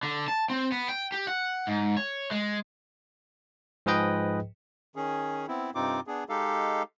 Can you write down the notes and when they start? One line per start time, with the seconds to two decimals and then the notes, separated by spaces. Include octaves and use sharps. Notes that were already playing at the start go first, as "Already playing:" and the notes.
0.03 D3
0.28 A5
0.50 C4
0.72 B3
0.88 G5
1.12 G4
1.27 F#5
1.67 G#2
1.97 C#5
2.31 G#3
3.86 G#2 F3 G#4 B4 D#5 G5
4.96 D#3 C#4 G#4
5.48 B3 C4 E4
5.75 G2 C3 C4 D#4 F4 D6
6.07 B3 D4 G#4
6.29 G#3 D#4 G4 A4 F5